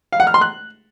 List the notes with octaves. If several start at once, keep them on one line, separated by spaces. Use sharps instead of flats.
F5
F#5
F6
C6
F#6